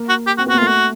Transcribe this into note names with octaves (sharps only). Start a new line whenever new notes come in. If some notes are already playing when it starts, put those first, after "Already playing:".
Already playing: A#3
F#4
G4
C4 F#4
B3
F#4
A#3
A3 F4
F#4